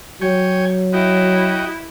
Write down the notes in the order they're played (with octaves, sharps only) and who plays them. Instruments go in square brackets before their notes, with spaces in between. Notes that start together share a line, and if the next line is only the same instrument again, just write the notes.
[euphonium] F#3 [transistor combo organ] C#5 G5 G#5
[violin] E4 [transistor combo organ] F#4 D#5 G5